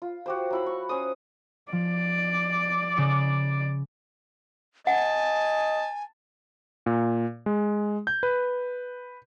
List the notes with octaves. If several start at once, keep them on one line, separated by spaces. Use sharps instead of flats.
F4
F#4 G4 C5
F#3 E4 B5
C#6
C#4 C5 D#6
F3 D5
C#3 D6 C#7
D#5 F#5 G#5 A5
A#2
G#3
G6
B4